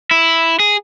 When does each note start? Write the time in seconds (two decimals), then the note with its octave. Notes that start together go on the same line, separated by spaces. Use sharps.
0.11 E4
0.59 G#4